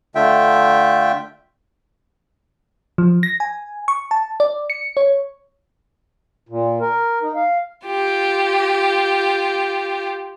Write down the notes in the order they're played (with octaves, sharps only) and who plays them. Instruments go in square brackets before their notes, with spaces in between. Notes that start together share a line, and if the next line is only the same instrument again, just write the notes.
[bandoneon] D3 A3 F4 E5 G5
[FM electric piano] F3
A#6
G#5
C#6
A5
D5
C#7
C#5
[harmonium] A#2
A#4
D#4
F5
[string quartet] F4 G4